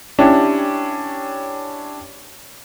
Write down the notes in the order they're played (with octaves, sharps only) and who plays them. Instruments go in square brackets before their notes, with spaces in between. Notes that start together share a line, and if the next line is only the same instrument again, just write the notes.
[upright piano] C#4 D4 E4 G4